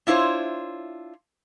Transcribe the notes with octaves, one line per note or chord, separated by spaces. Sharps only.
D4 E4 F4 C5 C#5